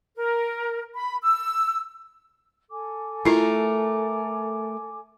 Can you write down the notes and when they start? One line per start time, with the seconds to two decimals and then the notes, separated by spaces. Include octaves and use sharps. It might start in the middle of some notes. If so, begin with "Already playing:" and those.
0.16 A#4
0.95 B5
1.22 E6
2.70 A4 G#5 D6
3.25 A3 E4 F4 A#4